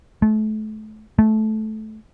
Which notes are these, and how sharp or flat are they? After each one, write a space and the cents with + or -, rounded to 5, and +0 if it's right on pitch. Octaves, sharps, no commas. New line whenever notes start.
A3 -30
A3 -15